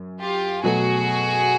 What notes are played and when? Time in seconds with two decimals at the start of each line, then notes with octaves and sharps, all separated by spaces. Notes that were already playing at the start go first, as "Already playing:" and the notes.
Already playing: F#2
0.19 F4 G4
0.63 B2 F#3 A3 F#4 G#4